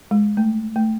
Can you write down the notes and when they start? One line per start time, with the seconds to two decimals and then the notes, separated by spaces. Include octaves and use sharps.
0.11 G#3
0.37 A3
0.76 A3